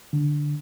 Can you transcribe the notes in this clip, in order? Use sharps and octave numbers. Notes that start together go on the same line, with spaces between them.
D3